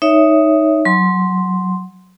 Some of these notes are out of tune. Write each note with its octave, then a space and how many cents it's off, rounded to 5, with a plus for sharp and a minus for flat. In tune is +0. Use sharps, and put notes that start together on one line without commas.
D#4 +0 C#5 +10 E5 +0
F#3 +0 C6 +0